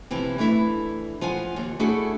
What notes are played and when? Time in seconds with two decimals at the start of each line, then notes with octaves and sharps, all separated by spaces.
0.11 C3 E3 F3 C4
0.38 E3 A3 D4 E4
1.21 F3 F4 F#5 G#5
1.56 D#2
1.79 A3 D4 E4 F#4 G#4 A4